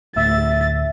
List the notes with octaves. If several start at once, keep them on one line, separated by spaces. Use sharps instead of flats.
D2 A2 E5 A6